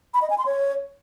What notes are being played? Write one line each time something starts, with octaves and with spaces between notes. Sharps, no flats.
B5
D#5
G#5
C6
C#5